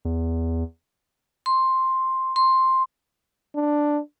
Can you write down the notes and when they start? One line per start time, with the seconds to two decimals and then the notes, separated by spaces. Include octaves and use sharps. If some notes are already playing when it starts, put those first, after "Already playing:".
0.05 E2
1.46 C6
2.36 C6
3.55 D4